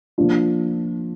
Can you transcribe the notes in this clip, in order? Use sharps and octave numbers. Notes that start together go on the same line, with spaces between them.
F3 A#3 D4 F4